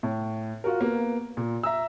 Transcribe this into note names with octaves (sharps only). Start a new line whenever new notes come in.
A2
F4 F#4 A#4
A#3 B3
A#2
E5 A#5 E6